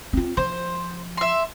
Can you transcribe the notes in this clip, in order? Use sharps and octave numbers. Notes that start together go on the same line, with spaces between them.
C4 F4
F3 C5
E5 C6